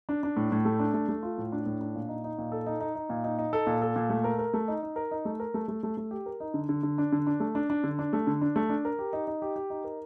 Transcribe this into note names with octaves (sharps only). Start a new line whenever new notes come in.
D4
D4
A2
A2
A3
D4
A3
A3
F4
A2
D4
A2
D4
A#2
D#4
D#4
A#2
A4
D#4
D#4
D#4
A#2
D#4
D#4
A4
A#2
A4
A#2
A3
A#4
A#4
A3
D#4
D#4
A#4
D#4
A3
A#4
A3
A3
A3
A3
G4
A#4
D#4
D3
D3
D3
D4
D3
D4
A3
D4
D4
D3
D4
A3
D3
D4
A3
D4
A#4
G4
D#4
D#4
G4
G4
D#4
A#4